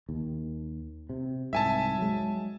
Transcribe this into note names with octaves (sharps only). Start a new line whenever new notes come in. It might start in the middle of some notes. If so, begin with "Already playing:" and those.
D#2
C3
C2 G#2 E5 G#5 A5
F#3 G#3